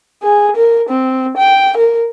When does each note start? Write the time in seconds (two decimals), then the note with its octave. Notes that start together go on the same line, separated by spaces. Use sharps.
0.23 G#4
0.56 A#4
0.89 C4
1.37 G5
1.77 A#4